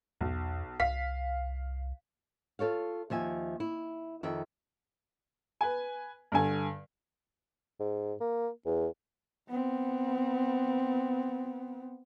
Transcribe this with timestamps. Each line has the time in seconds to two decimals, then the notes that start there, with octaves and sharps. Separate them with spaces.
0.21 B1 E2
0.80 C2 F5 B6
2.59 F4 G4 A4 C#5 F5
3.10 D#2 F3 E5 G#5
3.60 E4
4.23 F2 D#3 E5
5.61 B4 G#5
6.32 G2 D3 G#5
7.80 G#2
8.21 A#3
8.66 E2
9.49 B3 C4